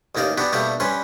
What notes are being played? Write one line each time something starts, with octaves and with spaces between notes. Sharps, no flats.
A1 D#2 A#3 D#4 D5 F5
B3 D4 F#4 G4
B2 G3 A3 A#3 D4 G4
G2 G3 C#4 B4 C6